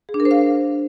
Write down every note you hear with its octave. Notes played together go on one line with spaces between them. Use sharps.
G#4
D4
A#4
C5
F5